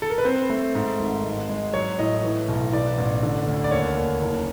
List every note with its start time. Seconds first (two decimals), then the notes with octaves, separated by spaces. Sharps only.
0.02 A4
0.10 A#4
0.18 B4
0.25 C4 C5
0.49 A3
0.75 G#2
1.00 G#1
1.24 G#3
1.49 G#3
1.74 F#3 C#5
1.99 A2 D#5
2.24 E3
2.49 B1
2.72 E3 D5
2.98 A1
3.23 D3
3.48 D2
3.64 D5
3.71 D#2 C#5
3.97 D#2
4.21 F#1